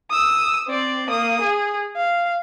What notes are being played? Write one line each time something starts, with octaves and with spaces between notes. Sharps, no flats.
D#6 E6
C4 D5
A#3 D#6
G#4
F5